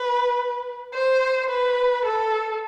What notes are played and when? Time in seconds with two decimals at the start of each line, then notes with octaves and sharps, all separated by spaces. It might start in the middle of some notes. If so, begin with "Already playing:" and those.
Already playing: B4
0.93 C5
1.49 B4
2.05 A4